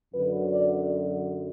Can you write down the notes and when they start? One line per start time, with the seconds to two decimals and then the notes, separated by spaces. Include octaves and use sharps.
0.14 F#2 D3 F#3 B4
0.51 D5